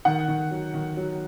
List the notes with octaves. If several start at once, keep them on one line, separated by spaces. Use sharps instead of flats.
D#3 F#5
D#3
F#3
D#3
F#3